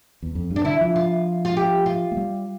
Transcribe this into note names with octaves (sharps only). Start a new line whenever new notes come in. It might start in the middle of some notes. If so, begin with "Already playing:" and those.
E2
F2
G2
D4
D3 E4
F3
F4
F4
G4
F4
A3
G3